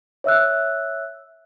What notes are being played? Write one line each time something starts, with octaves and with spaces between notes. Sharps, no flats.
C#5 E5 E6 F#6